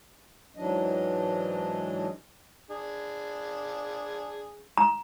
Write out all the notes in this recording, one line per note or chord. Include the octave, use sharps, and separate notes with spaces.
G#2 E3 F#3 D4 D#5
D4 G#4
A#5